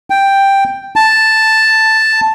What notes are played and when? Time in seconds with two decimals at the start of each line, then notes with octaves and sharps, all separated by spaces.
0.10 G5
0.96 A5